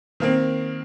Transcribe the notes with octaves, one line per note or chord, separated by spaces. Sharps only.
D#3 A#3 C4